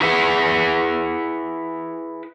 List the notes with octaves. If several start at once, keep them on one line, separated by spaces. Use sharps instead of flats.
E4 G#4 B4 E5 F#5